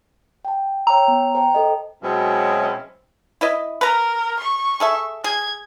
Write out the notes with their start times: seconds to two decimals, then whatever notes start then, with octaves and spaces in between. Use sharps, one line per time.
0.45 G5 A5
0.87 C#5 G5 A#5 E6
1.08 B3
1.35 C5 G5 A5
1.55 A4 D#5
2.03 B2 F#3 G#3 C4 C#4 E4
3.41 E4 B4 D#5
3.81 A#4 B4 A#5
4.39 C#6
4.80 G#4 A4 E5
5.24 G#4 G#6